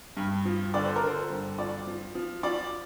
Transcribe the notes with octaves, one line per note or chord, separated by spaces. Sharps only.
G2
F3
D3 D5
C5
A#4
D3
C5
G2
F3 D5
F3
F3
F3 D5